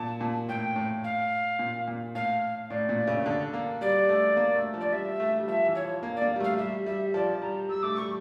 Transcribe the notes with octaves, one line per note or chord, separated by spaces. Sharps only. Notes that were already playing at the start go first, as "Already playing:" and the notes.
Already playing: A#2 A5
A#2
A2 G5
A2
F5
A#2
A#2
A2 F5
A2 D5
A#2
C#3
D3
A#3
G3 D5
A3
A#3
A3
F3
D5
G3 E5
A3
G3
F3 E5
E3
C#5
F3
A#3
D5
A#3
G3
A3 F5
G3 E5
G3 E5
F3 D5
G3 A#5
G3 E6
A3 D6
G3 C#6